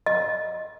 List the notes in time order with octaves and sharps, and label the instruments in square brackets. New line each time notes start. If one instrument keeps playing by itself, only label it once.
[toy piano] D#5